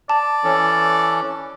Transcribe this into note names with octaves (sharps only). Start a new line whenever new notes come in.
D5 A5
E3 C#4 A4